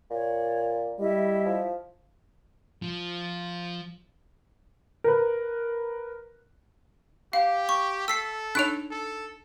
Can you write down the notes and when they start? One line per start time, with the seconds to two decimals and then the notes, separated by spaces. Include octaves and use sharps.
0.11 A#2 C#5 D5
0.99 G3 E4 D#5 E5
1.46 F3
2.82 F3
5.04 A#4 B4
7.33 G4 F5
7.69 C#6
8.08 A4 E6 B6 C7
8.55 D4 D#4 C#5 F#6 F7
8.91 A4